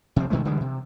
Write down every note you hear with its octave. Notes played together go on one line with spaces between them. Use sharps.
C3 F3 C4
B2 D#3 G#3 A3
D3 E3 G3 G#3
C3